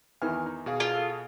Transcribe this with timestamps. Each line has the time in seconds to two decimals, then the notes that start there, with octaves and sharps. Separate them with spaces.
0.22 E2 D#3 E3 G#5 F6
0.46 D#4
0.66 B2 G#4 F5
0.80 F4
0.95 A4